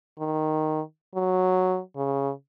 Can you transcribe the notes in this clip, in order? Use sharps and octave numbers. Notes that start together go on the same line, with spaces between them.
D#3
F#3
C#3